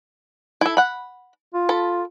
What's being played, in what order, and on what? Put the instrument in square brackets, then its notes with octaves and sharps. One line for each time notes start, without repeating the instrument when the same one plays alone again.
[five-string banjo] E4 A4
F#5 B5
[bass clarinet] F4
[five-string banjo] A4 B5